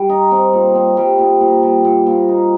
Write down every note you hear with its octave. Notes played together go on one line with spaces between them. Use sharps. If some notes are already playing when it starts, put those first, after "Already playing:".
Already playing: G3
D#4
C4
A#2
C4
G3
A#2
A#2
G3
A#2
A#2
D#4